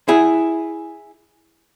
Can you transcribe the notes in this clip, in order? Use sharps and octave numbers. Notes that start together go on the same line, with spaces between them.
E4 G#4